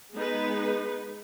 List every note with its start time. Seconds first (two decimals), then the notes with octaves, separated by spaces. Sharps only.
0.14 G#3 B3 D#4 G#4 B4